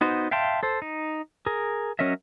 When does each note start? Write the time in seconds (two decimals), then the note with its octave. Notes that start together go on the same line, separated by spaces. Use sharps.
0.01 B3 D#4 F#4 C5
0.31 E5 F5 G5 A5 C6
0.63 A4 C5
0.82 D#4
1.46 G#4 A#4
1.99 F#3 C#4 A#4 D#5 E5